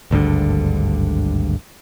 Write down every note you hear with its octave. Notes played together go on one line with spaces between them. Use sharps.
G#1 D2 G2 D3